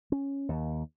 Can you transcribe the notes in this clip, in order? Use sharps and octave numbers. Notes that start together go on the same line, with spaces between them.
C#4
D#2